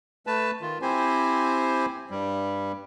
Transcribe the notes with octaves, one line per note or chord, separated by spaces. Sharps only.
A3 B4 A5
D#3 F4
C4 E4 G4 C5 G#5
G2 G3